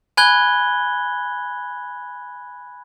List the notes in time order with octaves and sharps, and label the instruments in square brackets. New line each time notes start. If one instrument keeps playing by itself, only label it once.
[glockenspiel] G#5 B5 F#6 G#6 G7